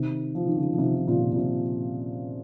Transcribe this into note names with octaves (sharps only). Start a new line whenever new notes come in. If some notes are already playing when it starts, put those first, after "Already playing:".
Already playing: C3 D#3
F3
D#3
C#3 F3
F3
C3 D#3
D#3
A#2 C#3
A#2
C3